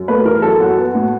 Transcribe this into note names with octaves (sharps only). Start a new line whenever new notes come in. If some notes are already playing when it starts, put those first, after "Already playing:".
Already playing: F#2
A3 B4
E3 A#4
F#2 A4
F#3 F#4
B3
A2